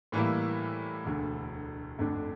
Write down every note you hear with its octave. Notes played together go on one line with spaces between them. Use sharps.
A2 E3 G3 A#3 E4
E1 D2 D3
G1 F2 D3 A3 D4